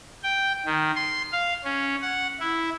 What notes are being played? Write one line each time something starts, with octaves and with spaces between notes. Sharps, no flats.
G5
D#3
C6
F5
C#4
F#5
E4